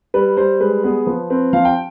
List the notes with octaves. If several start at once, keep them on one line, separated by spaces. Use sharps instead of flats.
G3 B4
G3 C5
G#3 B4
B3 G#4
F3 B4
C4 B4
F3 F5
G5